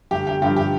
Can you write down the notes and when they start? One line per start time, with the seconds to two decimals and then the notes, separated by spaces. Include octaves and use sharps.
0.11 G1 G4
0.27 G4
0.42 G2 D3 F3 G4
0.57 G4